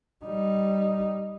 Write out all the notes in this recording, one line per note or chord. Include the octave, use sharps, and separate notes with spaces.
G3 D#4